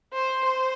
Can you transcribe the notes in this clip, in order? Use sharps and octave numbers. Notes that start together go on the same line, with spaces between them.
C5
C5